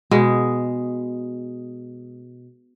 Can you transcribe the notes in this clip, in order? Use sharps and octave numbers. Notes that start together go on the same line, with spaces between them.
B2 G#3